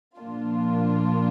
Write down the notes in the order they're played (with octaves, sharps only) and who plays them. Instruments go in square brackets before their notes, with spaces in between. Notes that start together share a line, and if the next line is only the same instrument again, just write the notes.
[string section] A#2 F3 A#3 D4 F4